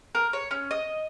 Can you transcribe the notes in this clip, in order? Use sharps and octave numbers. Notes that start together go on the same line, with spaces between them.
A#4
C#5
C#4
D#5